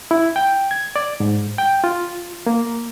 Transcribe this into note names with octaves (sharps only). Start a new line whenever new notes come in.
E4
G5
G#6
D5
G#2
G5
F4
A#3